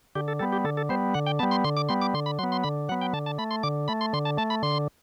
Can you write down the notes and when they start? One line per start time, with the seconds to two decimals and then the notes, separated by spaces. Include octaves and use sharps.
0.15 D3 G4
0.28 A4
0.39 G3 B3 A4
0.53 G4
0.64 D3 A4
0.77 A4
0.89 G3 B3 C5
1.14 D3 F#5
1.26 G5
1.39 G3 B3 A5
1.51 C6
1.64 D3 C6
1.77 D6
1.89 G3 B3 C6
2.01 D6
2.14 D3 C6
2.26 B5
2.39 F#3 B3 C6
2.52 C6
2.64 D3 B5
2.89 F#3 F#5
2.92 B3
3.01 G5
3.13 D3 A5
3.26 A5
3.38 A3 B5
3.51 C6
3.63 D3 D6
3.88 A3 B5
4.01 C6
4.13 D3 C6
4.25 A5
4.37 A3 A5
4.50 B5
4.63 D3 C6